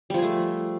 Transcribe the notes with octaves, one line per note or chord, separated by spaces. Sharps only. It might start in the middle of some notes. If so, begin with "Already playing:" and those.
F3 G3 A3 G#4